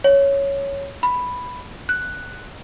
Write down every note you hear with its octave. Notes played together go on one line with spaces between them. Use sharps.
C#5
B5
F#6